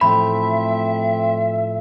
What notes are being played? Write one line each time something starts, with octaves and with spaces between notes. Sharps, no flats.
A2 F3 A3 C4 E5 B5